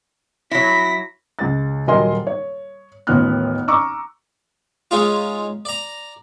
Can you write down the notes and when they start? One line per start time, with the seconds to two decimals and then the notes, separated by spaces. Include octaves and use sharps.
0.51 F#3 E4 A#6 B6
1.39 C#2 A6
1.87 D#1 F#3 A#4 D#5 G#5 C6
2.27 C#5
3.07 A1 D#2 B3 F4 F6 F#6
3.68 A#5 C#6 D6 E6
4.91 G#3 C#4 D#4 F4
5.65 D5 A#5